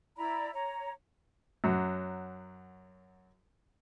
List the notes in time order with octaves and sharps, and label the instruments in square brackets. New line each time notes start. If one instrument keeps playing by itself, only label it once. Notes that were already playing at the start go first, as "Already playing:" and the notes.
[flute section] E4 D5 A#5 B5
C#5 A#5
[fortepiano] F#2 F#3